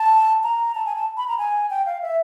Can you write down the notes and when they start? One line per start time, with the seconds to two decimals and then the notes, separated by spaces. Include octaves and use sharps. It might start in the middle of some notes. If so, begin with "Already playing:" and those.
Already playing: A5
0.44 A#5
0.75 A5
0.86 G#5
0.96 A5
1.17 B5
1.28 A#5
1.38 G#5
1.70 G5
1.86 F5
2.02 E5